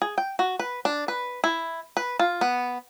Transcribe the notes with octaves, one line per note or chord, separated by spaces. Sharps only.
G#4
G5
F#4
B4
D4
B4
E4
B4
F4
B3